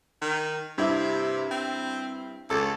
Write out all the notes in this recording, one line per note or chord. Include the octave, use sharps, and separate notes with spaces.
D#3
G2 C3 E4
C4
C#2 A4